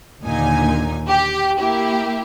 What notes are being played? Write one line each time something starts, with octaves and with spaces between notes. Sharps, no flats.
D#2 A#2 D3 D#4 G#5
G4
A#3 E4 G4